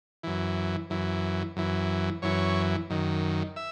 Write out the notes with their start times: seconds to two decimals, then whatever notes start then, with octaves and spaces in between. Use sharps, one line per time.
0.23 F#2 E3
0.90 F#2 E3
1.57 F#2 E3
2.22 F#2 E3 C#5
2.90 F#2 D#3
3.56 E5